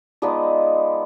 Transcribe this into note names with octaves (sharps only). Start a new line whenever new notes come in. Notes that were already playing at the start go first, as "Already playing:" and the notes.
F3 G#3 B3 D#4 D5